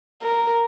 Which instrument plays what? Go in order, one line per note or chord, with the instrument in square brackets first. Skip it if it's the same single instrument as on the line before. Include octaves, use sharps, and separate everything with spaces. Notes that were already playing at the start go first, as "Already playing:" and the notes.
[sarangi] A#4